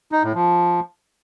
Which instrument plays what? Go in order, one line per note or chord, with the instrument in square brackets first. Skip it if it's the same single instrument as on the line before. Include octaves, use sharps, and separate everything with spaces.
[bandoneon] D#4
A2
F3